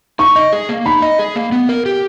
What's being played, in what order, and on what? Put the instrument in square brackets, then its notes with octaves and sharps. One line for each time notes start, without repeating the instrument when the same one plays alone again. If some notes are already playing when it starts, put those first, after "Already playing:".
[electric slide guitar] D#4 [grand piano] C#6
[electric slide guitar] D#5
G#4
A#3
[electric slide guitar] D#4 [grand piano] B5
[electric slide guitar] D#5
G#4
A#3
B3
A#4
G4